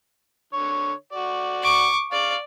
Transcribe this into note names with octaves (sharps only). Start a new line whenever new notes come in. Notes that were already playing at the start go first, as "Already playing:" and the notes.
D3 C#5
F#4 D5
C#6 D6
D5 F5 C#6